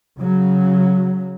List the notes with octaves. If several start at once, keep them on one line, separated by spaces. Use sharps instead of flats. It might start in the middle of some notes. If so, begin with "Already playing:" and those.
C#3 F#3